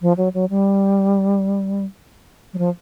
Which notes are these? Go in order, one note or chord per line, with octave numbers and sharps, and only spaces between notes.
F3
F#3
F#3
G3
F#3
F3